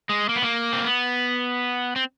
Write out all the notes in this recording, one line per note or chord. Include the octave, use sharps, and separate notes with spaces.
G#3
A#3
B3
A#3
C4
B3
C4